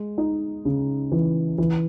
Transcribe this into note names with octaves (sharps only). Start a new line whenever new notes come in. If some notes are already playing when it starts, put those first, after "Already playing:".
Already playing: G#3
D#4
C#3
E3
E3